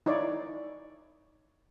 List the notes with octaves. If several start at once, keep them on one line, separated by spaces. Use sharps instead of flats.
D#4 E4 C#5 D5